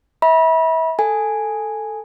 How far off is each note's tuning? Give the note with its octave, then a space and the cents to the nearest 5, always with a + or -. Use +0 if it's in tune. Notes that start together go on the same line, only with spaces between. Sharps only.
E5 -30 B5 -30
A4 +5 G#5 +0